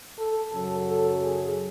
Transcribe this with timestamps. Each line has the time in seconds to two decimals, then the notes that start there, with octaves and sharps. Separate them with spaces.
0.17 A4
0.52 F#2 C#3 F#3 A4
0.87 A4
1.22 G#4